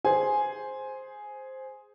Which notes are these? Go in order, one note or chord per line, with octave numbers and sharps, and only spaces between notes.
G#4 C5 G#5